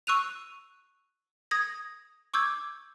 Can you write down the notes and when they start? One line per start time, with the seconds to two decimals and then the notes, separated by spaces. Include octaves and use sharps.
0.07 C#6 E6 F#6 D#7 F7
1.51 D#6 G#6 A#6
2.34 C#6 D6 E6 G6 G#6